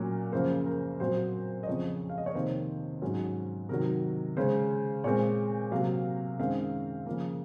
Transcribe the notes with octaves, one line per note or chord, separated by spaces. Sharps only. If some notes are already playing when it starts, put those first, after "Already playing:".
Already playing: A#2 F#3 A#3 C#4
F#2 C#3 F3 A#3 C5
A#4
A#2 F#3 C4 C5
D#5
F2 C#3 F3 C4 C#5
F5
D#5
C#5
F2 C3 D#3 A#3 C5
G#2 F#3 C#4
C3 D#3 F#3 A#4
C#3 G#3 C#4 C5
A#2 G#3 C4 C#5
C3 F#3 A#3 F5
F#2 D#3 G#3 C4 F5
C#3 F3 A#3